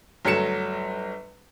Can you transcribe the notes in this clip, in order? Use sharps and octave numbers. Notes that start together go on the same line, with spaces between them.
G1 F#3 A3 C#7 E7